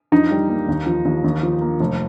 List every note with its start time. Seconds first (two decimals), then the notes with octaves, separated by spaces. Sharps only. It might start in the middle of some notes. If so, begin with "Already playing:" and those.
0.12 F2 D#4
0.31 G3
0.49 A#3
0.68 D#2
0.86 F3
1.05 D#2
1.24 D#2
1.43 F3
1.61 A#3
1.80 F1